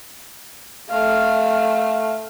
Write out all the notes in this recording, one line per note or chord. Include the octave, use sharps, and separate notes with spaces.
A3 F5